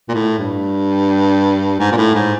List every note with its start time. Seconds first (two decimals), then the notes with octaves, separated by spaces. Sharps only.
0.09 A#2
0.14 A2
0.38 G2
1.80 G#2
1.92 A#2
1.97 A2
2.15 G#2